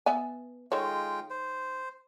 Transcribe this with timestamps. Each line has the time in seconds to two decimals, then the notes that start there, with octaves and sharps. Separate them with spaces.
0.06 B3 E5 G#5
0.72 D#3 G#3 F4 A4 C#5 G5
1.30 C5